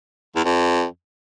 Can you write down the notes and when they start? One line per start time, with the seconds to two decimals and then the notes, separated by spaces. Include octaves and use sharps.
0.36 E2
0.45 F2